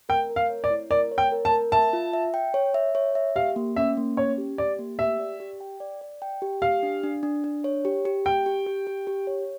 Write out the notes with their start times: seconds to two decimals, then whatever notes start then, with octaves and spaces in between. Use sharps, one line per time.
0.09 A#4 G5
0.30 A#4
0.36 F5
0.50 C#5
0.64 D5
0.70 E4
0.90 A#4 D5
1.11 C#5
1.18 G5
1.32 A#4
1.45 A5
1.52 A#4
1.72 E5 A5
1.93 F4
2.13 E5
2.34 G5
2.54 C#5
2.74 E5
2.95 C#5
3.15 E5
3.36 G4 F5
3.56 A#3
3.76 C#4 E5
3.97 A#3
4.17 C#4 C#5
4.38 G4
4.58 G4 D5
4.79 A#3
4.99 G4 E5
5.19 D5
5.40 G4
5.61 G5
5.80 D5
6.01 D5
6.22 G5
6.42 G4
6.62 G4 F5
6.83 D4
7.03 D4
7.23 D4
7.44 D4
7.64 C#5
7.85 G4
8.05 G4
8.25 G4 G5
8.46 G4
8.66 G4
8.87 G4
9.07 G4
9.27 C#5